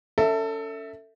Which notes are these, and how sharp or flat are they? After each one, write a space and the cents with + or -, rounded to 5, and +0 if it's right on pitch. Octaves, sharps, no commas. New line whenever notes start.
C#4 +30 A4 +25 E5 -10